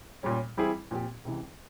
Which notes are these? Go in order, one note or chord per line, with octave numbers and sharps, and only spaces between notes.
A#2 G3 C#4
E3 G3 C4 E4 G#4
A#2 F3 C4 G4
C#2 C3 E3